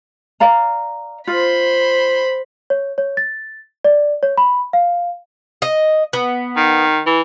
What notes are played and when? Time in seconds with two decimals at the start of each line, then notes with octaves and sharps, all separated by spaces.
0.40 D5 F5 A#5
1.27 F4 C5 B5
2.70 C#5
2.98 C#5
3.17 A6
3.85 D5
4.23 C#5
4.37 B5
4.73 F5
5.62 D#5
6.13 B3
6.56 D#3
7.06 E3